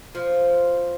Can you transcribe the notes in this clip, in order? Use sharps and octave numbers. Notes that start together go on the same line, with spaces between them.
F3